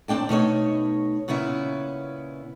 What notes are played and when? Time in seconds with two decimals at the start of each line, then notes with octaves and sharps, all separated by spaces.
0.08 D#2 C4 D4 G5 A5
0.29 B2 A3 D#4 C#5
1.28 A#2 C#3 B3 C#4 E4